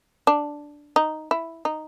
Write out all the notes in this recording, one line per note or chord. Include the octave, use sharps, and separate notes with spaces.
D4
D#4
E4
D#4